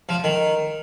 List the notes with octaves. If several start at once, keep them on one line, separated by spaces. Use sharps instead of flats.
F3
D#3